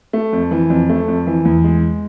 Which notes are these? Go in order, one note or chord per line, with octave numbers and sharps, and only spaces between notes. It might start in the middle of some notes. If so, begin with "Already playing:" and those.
A3
F2
E3
F2
A3
F2
E3
E2
G#3